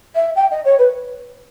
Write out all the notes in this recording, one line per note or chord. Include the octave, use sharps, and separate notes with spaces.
E5
G5
D#5
C#5
B4